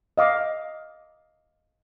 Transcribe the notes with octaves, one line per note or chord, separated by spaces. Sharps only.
D#5 F5 D6